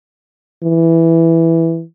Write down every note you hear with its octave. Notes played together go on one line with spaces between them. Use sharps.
E3